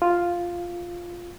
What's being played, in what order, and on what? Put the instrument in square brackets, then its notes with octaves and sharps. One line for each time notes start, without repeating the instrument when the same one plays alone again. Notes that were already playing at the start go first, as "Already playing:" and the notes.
[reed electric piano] F4